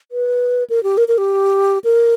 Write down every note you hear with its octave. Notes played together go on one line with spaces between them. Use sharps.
B4
A#4
G4
A#4
A#4
G4
A#4